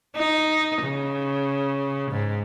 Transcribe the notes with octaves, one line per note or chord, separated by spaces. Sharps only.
D#4
C#3
G#2